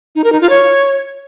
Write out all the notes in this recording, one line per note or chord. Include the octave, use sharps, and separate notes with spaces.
D#4
A#4
D#4
F4
C#5